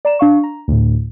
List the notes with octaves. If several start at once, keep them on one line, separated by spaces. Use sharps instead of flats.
D5 A#5 E7
D4 F5 C#6
A#5
D2 A2